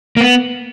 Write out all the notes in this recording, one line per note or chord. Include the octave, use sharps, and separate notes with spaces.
A#3
B3